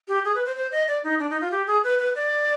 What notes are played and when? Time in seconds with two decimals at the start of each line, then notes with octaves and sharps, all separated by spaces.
0.08 G4
0.25 G#4
0.35 B4
0.46 C5
0.56 C5
0.72 D#5
0.88 D5
1.04 D#4
1.19 D4
1.30 D#4
1.41 F4
1.51 G4
1.67 G#4
1.84 B4
1.99 B4
2.15 D5